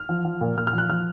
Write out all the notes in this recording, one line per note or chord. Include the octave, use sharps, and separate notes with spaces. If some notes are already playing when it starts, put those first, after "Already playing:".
Already playing: F6
F3
F3
A#2
A#2 F6
F6
F3
F#6
F3 F6